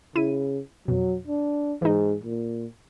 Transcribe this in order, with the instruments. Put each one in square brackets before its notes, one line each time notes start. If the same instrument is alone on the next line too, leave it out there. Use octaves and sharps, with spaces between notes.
[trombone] C#3 [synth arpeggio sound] E4 E5 D#7
[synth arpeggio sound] F2 B2 [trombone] F#3
[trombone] D4
[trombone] G#2 [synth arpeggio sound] E3 D#4
[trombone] A#2